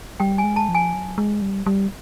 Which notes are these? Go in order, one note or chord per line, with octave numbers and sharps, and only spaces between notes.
G3 G5
G#5
G#3
A5
F3
G#5
F#3
G#3
G3
G3